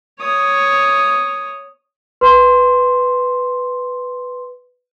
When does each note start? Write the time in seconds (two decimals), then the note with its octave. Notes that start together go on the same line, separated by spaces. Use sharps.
0.20 C#5 D#6
2.21 B4 C6